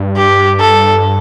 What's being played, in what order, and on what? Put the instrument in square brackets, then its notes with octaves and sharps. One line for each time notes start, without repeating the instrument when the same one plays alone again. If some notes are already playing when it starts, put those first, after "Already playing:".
Already playing: [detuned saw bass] G2
[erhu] G4
A4